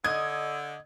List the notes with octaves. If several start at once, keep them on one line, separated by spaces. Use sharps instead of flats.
D3 D#5 G#6